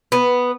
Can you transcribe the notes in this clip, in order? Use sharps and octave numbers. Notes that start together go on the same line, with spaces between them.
B3